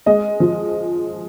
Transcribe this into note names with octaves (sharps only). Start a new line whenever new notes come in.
G#3 D#5
F3